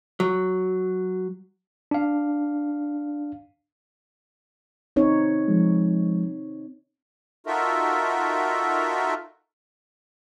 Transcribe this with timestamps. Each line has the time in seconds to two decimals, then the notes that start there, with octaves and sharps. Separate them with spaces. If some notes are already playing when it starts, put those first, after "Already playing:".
0.20 F#3
1.91 D4 F5
4.96 C4 D#4 C#5
5.48 F3 G#3
7.47 D#4 F4 F#4 A4 A#4 E5